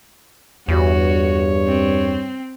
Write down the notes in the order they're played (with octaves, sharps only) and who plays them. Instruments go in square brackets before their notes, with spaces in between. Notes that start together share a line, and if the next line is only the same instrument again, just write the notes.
[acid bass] E2 [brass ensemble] G2 C#5 [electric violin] F#4
[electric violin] C4